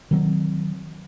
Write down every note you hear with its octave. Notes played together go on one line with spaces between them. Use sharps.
D#3 F#3 C4